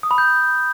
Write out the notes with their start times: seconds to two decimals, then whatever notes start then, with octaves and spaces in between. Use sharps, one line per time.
0.03 D#6
0.11 B5
0.18 G6